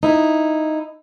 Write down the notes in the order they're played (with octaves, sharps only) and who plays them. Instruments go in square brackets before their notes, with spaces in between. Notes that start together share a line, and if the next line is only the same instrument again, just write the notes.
[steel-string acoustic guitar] D#4 E4